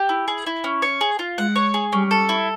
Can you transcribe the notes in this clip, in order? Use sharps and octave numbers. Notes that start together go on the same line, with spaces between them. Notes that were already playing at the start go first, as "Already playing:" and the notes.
Already playing: G4
E4
G#4
E4
C#4
C#5
G#4
F4
G#3 F#5
C#5
G#4
G3 C#4
A4
E4